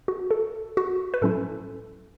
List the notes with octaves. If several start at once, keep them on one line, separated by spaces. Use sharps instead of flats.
F#4
A4
F#4
B4
A2 F#3 C#4 E4 A4